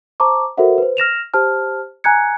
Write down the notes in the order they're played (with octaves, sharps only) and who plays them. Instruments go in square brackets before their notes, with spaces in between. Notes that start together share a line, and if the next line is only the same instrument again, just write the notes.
[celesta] C5 A5 A#5 C#6 D6
F#4 A4 A#4 C5 E5 F#5
B4 C5
F6 A#6 E7 F7
G4 C5 A5 F6
G#5 A#5 F#6 G#6 C#7